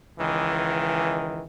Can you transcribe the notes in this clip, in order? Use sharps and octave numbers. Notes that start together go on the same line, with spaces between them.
C#2 D#3 E3